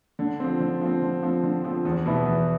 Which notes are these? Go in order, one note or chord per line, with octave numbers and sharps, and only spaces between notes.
D3
F3 C4
D3
F3 C4
D3
F3 C4
D3
F3 C4
E2
B2 B3 E4
E2